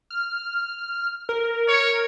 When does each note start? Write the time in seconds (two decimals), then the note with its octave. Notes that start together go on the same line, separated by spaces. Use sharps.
0.10 F6
1.29 A#4
1.68 C#5